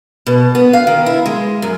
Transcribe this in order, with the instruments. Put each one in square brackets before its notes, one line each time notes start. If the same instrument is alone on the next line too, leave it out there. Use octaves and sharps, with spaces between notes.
[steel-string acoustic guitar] B2
B3
F5
D#3
E4
G#3
F#2